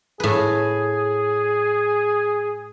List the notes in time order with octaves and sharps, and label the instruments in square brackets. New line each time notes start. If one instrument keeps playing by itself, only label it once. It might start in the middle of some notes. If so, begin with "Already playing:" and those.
[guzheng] A2 B4 [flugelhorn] G#4